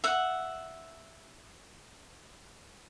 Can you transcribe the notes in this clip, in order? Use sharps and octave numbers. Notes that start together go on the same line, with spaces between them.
E5 F#5